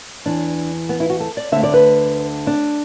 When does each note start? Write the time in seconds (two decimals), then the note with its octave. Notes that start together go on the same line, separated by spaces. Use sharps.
0.26 E2 E3 D4
0.89 B3
1.00 E4
1.10 F#4
1.20 A4
1.37 D5
1.52 D3 E5
1.56 D2
1.63 D5
1.73 B4
2.47 D4